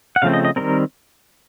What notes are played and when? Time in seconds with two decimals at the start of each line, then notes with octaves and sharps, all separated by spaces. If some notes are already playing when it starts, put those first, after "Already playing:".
0.16 F#5
0.22 C#3 F3 A3 C4 F5
0.34 D#5
0.45 D#5
0.56 D#3 G3 C4 A#4